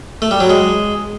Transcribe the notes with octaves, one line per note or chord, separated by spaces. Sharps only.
A3
G3
F#3
G#3